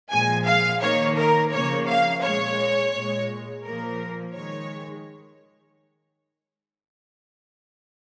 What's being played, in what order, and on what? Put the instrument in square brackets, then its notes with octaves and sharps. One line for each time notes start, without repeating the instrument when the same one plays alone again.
[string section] A#2 F3 G#3 G#5
F5
D#3 A#3 C#5
A#4
C#3 F3 A#3 C#5
F5
A#2 G#3 C#5
A#2 G#3
A#2 F3 A#3 A#4
D#3 G#3 C#5